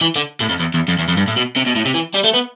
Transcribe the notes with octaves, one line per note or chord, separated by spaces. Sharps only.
E3
D3
A2
F2
E2
E2
F2
E2
F2
G2
A2
B2
C3
B2
A2
C3
E3
G3
A3
B3